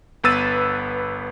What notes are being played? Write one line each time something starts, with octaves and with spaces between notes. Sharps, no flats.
G1 B3 B4 E6 A6 D#7